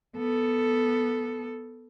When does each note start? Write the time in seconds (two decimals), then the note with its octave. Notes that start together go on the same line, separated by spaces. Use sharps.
0.17 B3 A4